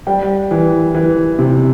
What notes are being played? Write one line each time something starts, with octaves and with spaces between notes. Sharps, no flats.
G3 G5
E3
E3
C3